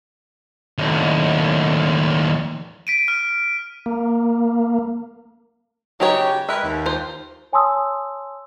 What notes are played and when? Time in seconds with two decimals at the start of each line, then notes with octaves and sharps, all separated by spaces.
0.78 D#2 A2
2.87 B6 D7 D#7
3.08 F6
3.86 A#3
6.00 C#3 F#3 D#4 F#4 G4 C#5
6.49 G#3 A#4 B4 E5
6.63 D#2
6.86 F4 C5
7.52 C#5 G#5 A5 C6 D#6 E6